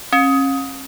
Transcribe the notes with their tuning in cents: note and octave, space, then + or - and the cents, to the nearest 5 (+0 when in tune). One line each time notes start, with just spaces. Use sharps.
C#4 -35